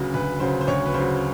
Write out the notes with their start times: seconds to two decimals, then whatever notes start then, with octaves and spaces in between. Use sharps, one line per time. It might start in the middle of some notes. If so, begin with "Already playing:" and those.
Already playing: D2 C#3 F#3 B4
0.14 D2 B4
0.40 C#3 F#3 C5
0.61 C5
0.67 D2 C#5
0.86 B4
0.94 C#3 F#3 C5